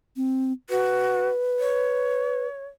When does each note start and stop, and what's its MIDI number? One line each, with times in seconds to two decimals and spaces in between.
0.16 0.52 60
0.70 1.28 66
0.70 2.47 71
1.60 2.66 73